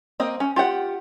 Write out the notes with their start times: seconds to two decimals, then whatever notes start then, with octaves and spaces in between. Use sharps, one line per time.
0.20 A#3 C4 D#5
0.40 C#4
0.56 F4 G4 F#5